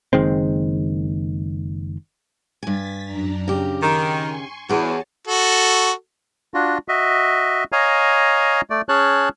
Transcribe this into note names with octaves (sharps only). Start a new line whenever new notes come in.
F#1 D#3 G#3 C4
G2 G#5 A6 B6
F#2 D4 A#5
C#3 G4
D#3 G#5 C6 C#6
E2 F#4 G#4 C#5 A5
F#4 A4
D4 F4 F#4
F#4 D#5 E5
C#5 D#5 F5 G#5 A#5
A3 D5
C#4 G#4 C#5 A5 F#6